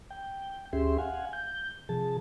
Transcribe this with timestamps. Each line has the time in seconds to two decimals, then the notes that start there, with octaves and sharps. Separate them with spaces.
0.10 G5
0.73 D2 C#4 G4 G#4 E5 C6
0.98 F5 F#5 G#5
1.33 G6
1.89 C3 F3 G#4 A5